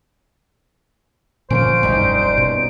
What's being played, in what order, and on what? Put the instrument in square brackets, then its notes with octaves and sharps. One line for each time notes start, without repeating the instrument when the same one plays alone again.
[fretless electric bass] A#2 D3 F3 [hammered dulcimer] A#3 C#4 [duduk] C5 [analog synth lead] D7
[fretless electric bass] F1 B1 G2 [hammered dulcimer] G3 D#4 A#4
[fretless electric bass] B2